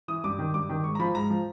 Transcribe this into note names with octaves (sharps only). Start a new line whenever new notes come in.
E3 D#6
G2 D6
D#3
G2 D6
D#3
G#2 C#6
A#5
F3 B5
G#2 A#5
F3